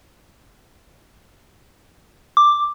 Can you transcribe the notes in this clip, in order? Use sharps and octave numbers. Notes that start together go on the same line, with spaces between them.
D6